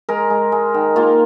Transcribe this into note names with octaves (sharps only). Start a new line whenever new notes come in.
G#3 A#4
G#3
G#3
D#3
A#3 F4